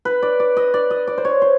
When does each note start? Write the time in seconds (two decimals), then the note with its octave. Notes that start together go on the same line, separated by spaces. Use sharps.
0.05 B4
0.22 D5
0.40 D5
0.57 D#5
0.74 D5
0.90 D#5
1.07 D5
1.18 C5
1.25 C#5
1.42 C5